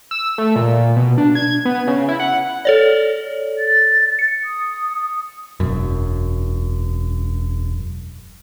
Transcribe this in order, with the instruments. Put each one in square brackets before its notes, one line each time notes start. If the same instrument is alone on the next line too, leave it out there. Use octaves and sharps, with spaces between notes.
[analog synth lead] E6
A3
A#2
B2
D4
G#6
B3
C#3
E4
F#5
[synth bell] A4 C#5 D5
[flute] A6
[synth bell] C#7
[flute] D#6
[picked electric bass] E1 F#2